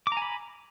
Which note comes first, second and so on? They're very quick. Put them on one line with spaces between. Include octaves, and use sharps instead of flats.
D6 A#5 G#5 B5